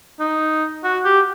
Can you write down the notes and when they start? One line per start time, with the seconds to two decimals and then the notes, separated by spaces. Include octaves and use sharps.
0.20 D#4
0.84 F#4
1.05 G4